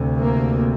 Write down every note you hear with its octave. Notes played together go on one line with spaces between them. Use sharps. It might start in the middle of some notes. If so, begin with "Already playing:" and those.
Already playing: D2 C3
A#3